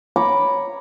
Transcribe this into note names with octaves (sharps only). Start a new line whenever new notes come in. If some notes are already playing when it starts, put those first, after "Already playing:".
C#5 A#5 B5 D6